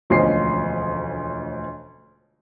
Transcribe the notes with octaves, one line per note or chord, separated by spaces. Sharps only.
E1 D2 F3 C#4 D#5 C7